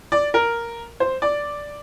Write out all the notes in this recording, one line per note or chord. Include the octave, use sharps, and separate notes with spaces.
D5
A#4
C5
D5